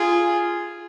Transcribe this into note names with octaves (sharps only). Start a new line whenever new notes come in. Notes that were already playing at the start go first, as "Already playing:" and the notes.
Already playing: F4 G#4